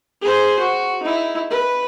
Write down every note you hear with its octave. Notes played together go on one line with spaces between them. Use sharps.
G#4 C5
F#4
D#4 E4
B4